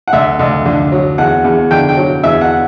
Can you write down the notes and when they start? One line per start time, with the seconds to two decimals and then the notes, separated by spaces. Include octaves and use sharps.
0.08 F#5
0.13 D2 E5
0.39 D2
0.66 D3
0.92 F#3
1.18 E2 F#5
1.44 E2
1.71 D3 G5
1.89 G5
1.97 F#3
2.23 E2 E5
2.41 F#5